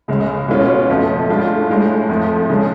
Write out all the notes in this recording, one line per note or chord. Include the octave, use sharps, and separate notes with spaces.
C#2 C#3 G#3
B2 G#3 C#4 F4
F#1 F2 F3 A3
A2 G#3 D4 F4
A2 G#3 D4
F2 F3 A3
C#3 G#3 D4